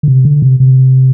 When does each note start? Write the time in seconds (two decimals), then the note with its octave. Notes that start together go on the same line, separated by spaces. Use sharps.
0.03 D3
0.08 C3
0.25 D3
0.42 C3
0.60 C3